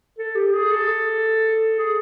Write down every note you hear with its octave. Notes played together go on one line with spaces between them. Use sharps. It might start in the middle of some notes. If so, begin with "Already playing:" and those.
A4
G4
G#4
A4
G#4